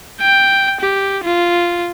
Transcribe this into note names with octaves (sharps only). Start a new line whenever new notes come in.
G5
G4
F4